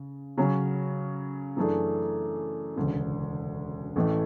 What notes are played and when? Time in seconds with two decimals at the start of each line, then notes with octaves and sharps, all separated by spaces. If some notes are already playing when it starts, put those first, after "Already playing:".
Already playing: C#3
0.38 C#3 F#3 C#4
1.57 F#2 E3 A3 D4 G#4
2.76 E1 D2 C#3
3.96 A1 A2 E3 A3